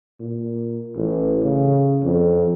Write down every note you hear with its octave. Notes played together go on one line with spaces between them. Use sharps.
A#2
A1
C#3
F2